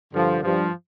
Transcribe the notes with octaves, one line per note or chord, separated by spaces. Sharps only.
G2 D3 F3
G2 F3